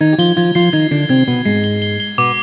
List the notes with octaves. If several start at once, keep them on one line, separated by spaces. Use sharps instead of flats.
D#3 D#4 G#6
G4
F3 F4 G7
F3 F4 G#6
F3 F4 C7
D#3 D#4 G#6
D3 D4 C7
C3 C4 G#6
B2 B3 G7
G#2 G#3 C7
G7
G7
G7
B2 B3 D6